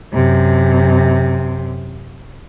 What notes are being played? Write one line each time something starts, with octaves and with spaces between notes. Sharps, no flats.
F#2 C3